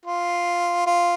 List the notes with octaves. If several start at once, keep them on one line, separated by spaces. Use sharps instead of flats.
F4
F4